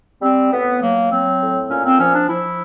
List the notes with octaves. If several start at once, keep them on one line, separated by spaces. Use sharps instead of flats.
G3 C4
A2 B3
F#3 A#3
F#3 C4
A2
A#2 C#4
C4
F3 C#4
D4
F3 E4